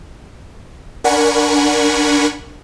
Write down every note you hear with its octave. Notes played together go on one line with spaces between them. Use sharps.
D4 A#4 F#5 G#5 B5 C#6